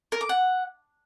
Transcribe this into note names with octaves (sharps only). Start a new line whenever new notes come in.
A#4
D6
F#5